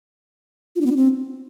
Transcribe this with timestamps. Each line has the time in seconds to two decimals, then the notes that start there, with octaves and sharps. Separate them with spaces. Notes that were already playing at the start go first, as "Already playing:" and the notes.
0.76 F4
0.81 D4
0.86 B3
0.91 D4
0.96 C4